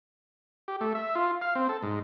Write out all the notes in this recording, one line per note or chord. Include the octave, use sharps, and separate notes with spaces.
G4
A3
E5
F4
F5
C4
A4
G#2